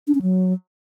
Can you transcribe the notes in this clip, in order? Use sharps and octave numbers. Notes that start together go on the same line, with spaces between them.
D4
C#4
F#3